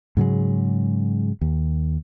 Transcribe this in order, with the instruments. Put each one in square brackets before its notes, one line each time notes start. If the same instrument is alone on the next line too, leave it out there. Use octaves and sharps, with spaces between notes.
[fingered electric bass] G#2 C#3 F#3 G#3
D#2